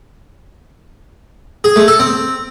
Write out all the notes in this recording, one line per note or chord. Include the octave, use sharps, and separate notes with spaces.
G#4
A3
A4
C4